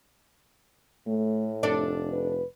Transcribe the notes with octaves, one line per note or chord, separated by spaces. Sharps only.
A2 A3
F1 D4 A4 D5
B4